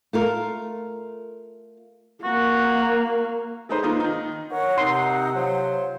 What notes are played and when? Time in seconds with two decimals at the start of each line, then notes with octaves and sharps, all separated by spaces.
0.13 A3 F4 A#4
2.24 A#3 F#4
3.69 G#3 A3 D#4 B4 C5
3.83 D#3 A#3 D#4 F4
4.00 D#3 D#4
4.51 A#4 C#5 F#5
4.78 C3 D#3 C4 D#4 C6
5.35 F3 F#3 C5